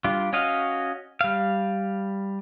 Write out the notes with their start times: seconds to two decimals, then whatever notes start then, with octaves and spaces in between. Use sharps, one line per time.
0.04 G3 D4 F4
0.33 C#4 F#4 D#5 F5
1.21 G3 F5